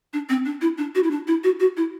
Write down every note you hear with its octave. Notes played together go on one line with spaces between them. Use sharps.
D4
C4
D4
E4
D4
F#4
E4
D4
E4
F#4
F#4
E4